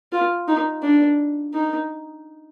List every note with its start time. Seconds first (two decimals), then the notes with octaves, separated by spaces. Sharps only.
0.12 F4
0.48 D#4
0.83 D4
1.54 D#4